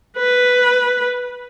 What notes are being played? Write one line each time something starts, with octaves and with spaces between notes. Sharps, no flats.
B4